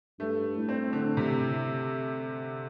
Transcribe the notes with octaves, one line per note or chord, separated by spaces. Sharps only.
G2 A3
A2
C4
D3
C3